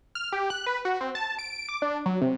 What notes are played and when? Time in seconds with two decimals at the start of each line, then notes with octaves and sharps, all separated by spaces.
0.15 F6
0.32 G4
0.50 F#6
0.67 B4
0.85 F#4
1.01 C4
1.15 A5
1.39 D7
1.69 D6
1.82 D4
2.06 F#3
2.21 C3